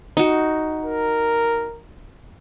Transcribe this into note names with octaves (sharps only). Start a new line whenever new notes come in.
D#4 F#4
A#4